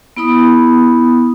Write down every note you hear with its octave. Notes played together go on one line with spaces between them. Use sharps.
B3 E4 B5 D#6